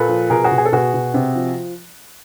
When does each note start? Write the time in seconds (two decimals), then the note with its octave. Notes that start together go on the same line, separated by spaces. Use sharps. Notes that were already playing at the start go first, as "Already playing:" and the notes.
Already playing: A#2 A4 B4
0.09 F3
0.30 B2 G#4 A#4
0.44 F#4 G#4
0.51 B2
0.58 G#4
0.65 A4
0.72 B2 F#4 G#4
0.94 B2
1.14 C3
1.35 F3